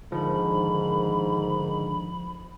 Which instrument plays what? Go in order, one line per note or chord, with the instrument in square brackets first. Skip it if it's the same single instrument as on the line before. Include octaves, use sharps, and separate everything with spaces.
[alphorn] G#2 [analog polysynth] D3 D#3 [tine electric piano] F3 [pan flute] B5